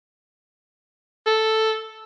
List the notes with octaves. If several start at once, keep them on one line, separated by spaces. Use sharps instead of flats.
A4